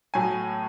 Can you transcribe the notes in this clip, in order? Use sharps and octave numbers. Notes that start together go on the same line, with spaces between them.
A2 F#3 G#5